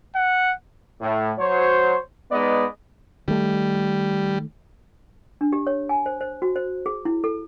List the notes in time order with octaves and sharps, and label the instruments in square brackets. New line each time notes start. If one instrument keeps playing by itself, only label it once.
[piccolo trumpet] F#5
[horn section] A2
F#3 C5 C#5
G#3 B3 D#4 B4 D5 D#5
[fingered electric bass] D#3 A3 [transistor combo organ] G3
[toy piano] D4
G4
C#5
G#5
C5
C5
F#4
C5
G#4
E4
A4